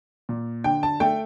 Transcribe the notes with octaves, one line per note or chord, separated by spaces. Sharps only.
A#2
D3 G5
A5
A3 G5